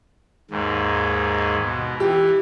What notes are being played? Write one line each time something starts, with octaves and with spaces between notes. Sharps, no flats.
D#2 G#2
B2
E3 G4